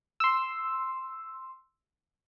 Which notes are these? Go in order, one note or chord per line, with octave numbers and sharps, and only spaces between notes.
C6 E6